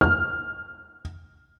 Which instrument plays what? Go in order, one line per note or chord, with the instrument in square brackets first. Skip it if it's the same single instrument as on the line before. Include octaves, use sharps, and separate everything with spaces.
[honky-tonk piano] F6